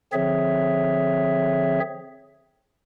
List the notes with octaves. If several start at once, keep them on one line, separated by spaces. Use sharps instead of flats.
D3 F3 C4 G#4 C#5 E5